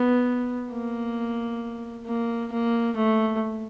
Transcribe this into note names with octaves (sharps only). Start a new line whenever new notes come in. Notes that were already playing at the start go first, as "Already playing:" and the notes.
Already playing: B3
A#3
A#3
A#3
A3